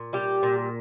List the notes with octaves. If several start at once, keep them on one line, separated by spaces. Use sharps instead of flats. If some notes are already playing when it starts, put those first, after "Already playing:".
Already playing: A#2
G3 G4
A#2